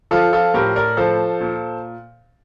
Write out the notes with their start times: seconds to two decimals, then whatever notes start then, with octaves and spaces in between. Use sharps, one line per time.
0.11 F3 F4 A4
0.33 F4 A4
0.54 A2 G4 A#4
0.76 A#4 D5
0.97 F3 A4 C5
1.41 A#2